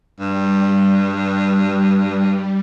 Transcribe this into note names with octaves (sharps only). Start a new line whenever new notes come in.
G2 G3